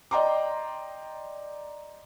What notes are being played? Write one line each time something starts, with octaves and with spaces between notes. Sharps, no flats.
D5 D#5 G5 A#5 C6 D6